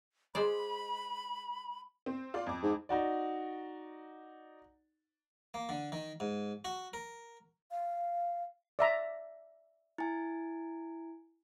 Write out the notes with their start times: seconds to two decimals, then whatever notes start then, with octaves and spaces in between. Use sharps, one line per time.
0.35 G#3 C5 D5 B5
2.06 C4
2.34 F4 D5
2.46 F2 D6
2.63 G#2
2.89 D#4 F#4 D5
5.54 A#3
5.69 D3
5.92 D#3
6.20 G#2
6.65 F#4
6.93 A#4
7.71 F5
8.79 D5 E5 A#5
9.98 E4 G#5